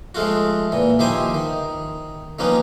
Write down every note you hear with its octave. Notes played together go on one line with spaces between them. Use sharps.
F3 G#3 A3 F4 F#4
A#2 E3
D#3 F3 E4 G4 C5 G#5
D#3
D#3 F3 A#3 B3 C#4 D#4